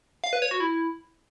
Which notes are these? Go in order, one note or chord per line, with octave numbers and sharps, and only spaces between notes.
F5
B4
C#5
F#4
E4